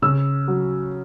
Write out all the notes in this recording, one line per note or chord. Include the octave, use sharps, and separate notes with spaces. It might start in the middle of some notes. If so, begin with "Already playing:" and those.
C#3 E6
F#3